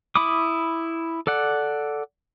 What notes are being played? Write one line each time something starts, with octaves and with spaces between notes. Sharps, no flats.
E4 B5 D6 D#6
A4 D5 F#5